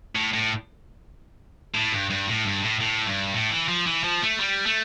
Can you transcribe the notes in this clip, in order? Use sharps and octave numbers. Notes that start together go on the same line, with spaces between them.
A2
A2
A2
G2
G2
A2
G2
A2
A2
G2
A2
E3
F3
E3
F3
A3
G3
A3